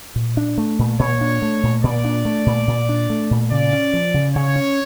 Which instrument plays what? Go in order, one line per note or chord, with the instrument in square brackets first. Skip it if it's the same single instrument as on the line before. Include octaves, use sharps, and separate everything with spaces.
[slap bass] A#2
D4
A3
A#2
[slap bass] A#2 [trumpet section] C#5
[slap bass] D4
A3
A#2
[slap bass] A#2 [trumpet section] D5
[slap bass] D4
A3
A#2
A#2
D4
A3
A#2
[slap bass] C#3 [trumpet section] D5
[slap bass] C#4
F3
C#3
[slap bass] C#3 [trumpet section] C#5
[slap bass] C#4